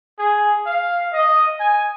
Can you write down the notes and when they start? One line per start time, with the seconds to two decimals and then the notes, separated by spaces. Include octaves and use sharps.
0.19 G#4
0.66 F5
1.13 D#5
1.60 G#5